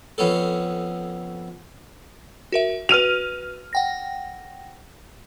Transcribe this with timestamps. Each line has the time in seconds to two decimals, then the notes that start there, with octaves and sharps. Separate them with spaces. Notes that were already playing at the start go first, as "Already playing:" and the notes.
0.18 F2 B3 C#4 A4
2.52 F#4 A#4 E5
2.89 F#4 B4 F6 D#7 F7
3.73 F#5 G5 A#6